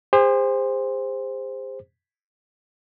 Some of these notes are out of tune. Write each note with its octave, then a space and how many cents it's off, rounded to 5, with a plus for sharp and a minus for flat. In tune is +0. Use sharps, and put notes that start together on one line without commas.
G#4 -45 C5 +0